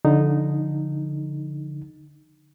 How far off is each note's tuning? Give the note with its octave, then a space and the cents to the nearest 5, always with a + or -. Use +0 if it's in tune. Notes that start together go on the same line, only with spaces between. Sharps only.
D3 -15 F3 +0 D#4 -5